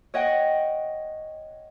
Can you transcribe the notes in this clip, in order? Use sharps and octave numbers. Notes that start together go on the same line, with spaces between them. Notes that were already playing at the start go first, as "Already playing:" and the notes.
C#5 D#5 F#5 G5